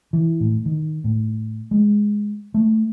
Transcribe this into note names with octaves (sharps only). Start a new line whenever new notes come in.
E3
A2
D#3
A2
G#3
A3